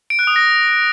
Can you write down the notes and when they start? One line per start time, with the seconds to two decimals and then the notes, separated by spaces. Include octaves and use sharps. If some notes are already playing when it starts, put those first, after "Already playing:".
0.10 D7
0.19 F#6
0.27 D#6
0.36 A#6